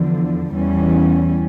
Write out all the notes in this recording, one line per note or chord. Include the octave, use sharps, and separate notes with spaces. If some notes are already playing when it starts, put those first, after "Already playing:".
Already playing: E2 D3 F3
E2 E3 G3 C#4